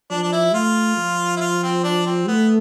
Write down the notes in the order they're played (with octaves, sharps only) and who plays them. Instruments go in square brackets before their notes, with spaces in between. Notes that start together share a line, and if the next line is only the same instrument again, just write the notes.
[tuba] F3 [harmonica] D4
[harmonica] D4
E4
[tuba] A3 [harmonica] F4
[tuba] F3
[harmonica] E4
F4
C4
D4
C4
[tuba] A3 [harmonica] B3